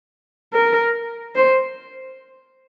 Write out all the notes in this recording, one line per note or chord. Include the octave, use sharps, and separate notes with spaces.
A#4
C5